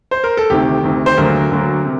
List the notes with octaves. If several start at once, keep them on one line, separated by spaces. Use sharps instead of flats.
C5
A#4
A4
D2 C3 D#3 G4
D2 C3 D#3
C5
D2 D3 F#3 A#3 A#4
D2 D3 F#3 A#3
C3